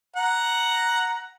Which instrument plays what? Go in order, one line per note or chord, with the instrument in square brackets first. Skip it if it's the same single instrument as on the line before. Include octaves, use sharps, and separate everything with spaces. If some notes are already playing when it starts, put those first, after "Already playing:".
[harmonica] F#5 A#5